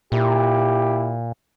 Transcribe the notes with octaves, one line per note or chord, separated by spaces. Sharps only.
A#2 E4 G4